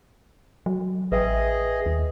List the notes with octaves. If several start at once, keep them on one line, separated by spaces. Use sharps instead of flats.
F#3
A1 G#4 B4 D#5 E5 G5
D#2